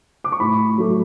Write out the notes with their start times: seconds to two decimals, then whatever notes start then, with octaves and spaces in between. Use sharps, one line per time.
0.24 D6
0.32 C#6
0.40 A2 B5
0.78 F#3 A3